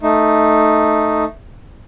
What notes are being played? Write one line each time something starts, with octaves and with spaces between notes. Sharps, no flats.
A3 D#4